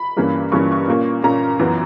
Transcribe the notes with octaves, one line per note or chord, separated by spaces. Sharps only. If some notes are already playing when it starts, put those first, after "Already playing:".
Already playing: B5
G2 E3 A#3 C#4
G2 E3 A#3 C#4 C#6
C#6
A#2 A#3 C#4
A#2 A#3 C#4 A#5
F#2 E3 B3